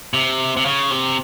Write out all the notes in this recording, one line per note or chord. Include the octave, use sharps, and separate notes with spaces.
C3
C3
C#3
C3